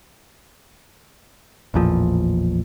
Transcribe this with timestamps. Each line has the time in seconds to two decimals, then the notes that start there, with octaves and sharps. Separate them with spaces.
1.74 A1 E2 A#2 F3